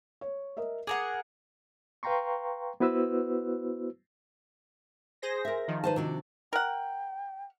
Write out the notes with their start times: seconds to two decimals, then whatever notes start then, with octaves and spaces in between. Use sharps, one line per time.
0.21 C#5
0.57 A#4 D#5 E5
0.87 G#4 A#4 F#5 D6
2.03 B4 F5 G5 A#5 C6 C#6
2.80 B3 E4 F#4 B4 C5 E6
5.22 G#4 C5 A#6
5.45 A#4 E5
5.68 D#3 F3
5.84 B4 C5 A5
5.96 C3 D4 F#4
6.53 A#4 F#5 G5